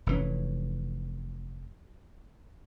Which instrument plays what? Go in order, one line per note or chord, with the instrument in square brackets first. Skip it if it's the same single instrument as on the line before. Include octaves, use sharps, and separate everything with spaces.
[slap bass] F1 E3 C#4